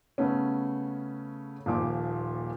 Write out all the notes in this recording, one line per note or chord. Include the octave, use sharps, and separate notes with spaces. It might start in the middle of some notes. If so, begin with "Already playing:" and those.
C#3 A3 B3 C#4
D#1 A#2 F3 D6